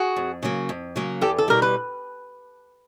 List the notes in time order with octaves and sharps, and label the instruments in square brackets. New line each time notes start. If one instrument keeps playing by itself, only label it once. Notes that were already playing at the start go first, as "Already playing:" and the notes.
Already playing: [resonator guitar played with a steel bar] F#4 G#4
[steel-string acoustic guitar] F2
C#3 F#3 A#3
F2
C#3 F#3 A#3
[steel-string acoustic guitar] E2 [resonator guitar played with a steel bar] G4 A4
[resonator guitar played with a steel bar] A4
[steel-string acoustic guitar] B2 G3 [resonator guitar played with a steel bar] A#4
[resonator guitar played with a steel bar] B4